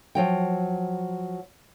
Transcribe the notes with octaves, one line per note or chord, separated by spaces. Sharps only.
F3 F#3 G5